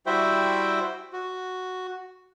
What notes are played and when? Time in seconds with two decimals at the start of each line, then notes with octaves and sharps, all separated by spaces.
0.06 G3 E4 F#4 C5 E5 G5
1.13 F#4